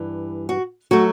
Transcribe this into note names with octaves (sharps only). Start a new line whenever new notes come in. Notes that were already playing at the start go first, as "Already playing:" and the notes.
Already playing: G2 E3 G3
F#4
F#3 A3 F#4